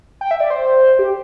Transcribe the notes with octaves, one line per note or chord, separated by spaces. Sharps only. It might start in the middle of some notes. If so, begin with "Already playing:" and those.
G5
E5
D5
C5
G4